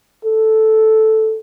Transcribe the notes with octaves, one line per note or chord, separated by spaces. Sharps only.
A4